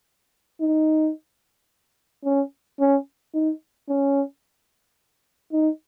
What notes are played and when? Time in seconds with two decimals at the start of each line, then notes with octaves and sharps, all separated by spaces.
0.61 D#4
2.25 C#4
2.80 C#4
3.34 D#4
3.89 C#4
5.53 D#4